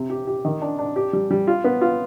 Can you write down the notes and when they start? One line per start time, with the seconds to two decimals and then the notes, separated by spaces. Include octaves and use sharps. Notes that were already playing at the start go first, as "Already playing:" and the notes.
Already playing: C3
0.10 G4
0.27 G4
0.45 D#3
0.61 D4
0.79 D4
0.96 G4
1.13 G3
1.31 G3
1.47 F4
1.64 B3
1.81 F4